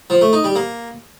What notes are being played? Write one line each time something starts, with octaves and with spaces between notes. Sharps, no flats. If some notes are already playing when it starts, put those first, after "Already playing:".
F3
A3
D#4
G3
A#3